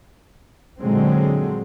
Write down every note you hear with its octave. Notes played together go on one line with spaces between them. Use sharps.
A#2 D3 F#3 G#3 C4